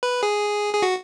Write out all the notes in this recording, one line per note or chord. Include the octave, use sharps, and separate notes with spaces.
B4
G#4
G#4
F#4